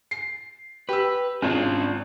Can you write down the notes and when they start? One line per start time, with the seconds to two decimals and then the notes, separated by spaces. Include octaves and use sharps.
0.11 C7
0.89 G4 B4 E6
1.42 G#1 C#4 D4 F4